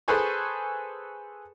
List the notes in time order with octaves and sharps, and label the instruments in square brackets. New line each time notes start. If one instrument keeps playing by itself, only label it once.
[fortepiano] G#4 A4 B4 C5 G#5 C#6